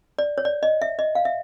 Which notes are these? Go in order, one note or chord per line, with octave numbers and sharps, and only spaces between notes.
D5
C#5
D5
D#5
E5
D#5
F5
E5